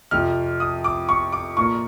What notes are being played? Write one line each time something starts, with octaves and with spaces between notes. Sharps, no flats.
F2 C3 F3 F6
D#6
D6
C#6
D6
A#2 F3 A#3 C#6